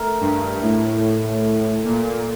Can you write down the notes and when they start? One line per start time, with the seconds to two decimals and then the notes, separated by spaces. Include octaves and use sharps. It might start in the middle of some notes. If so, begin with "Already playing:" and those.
Already playing: A3 A#4
0.21 G2
0.62 A2
1.85 A#2